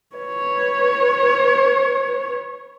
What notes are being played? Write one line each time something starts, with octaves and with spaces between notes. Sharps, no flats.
B4 C#5